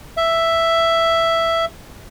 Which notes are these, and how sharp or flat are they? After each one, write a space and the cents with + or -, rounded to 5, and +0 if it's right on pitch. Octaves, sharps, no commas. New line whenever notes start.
E5 +5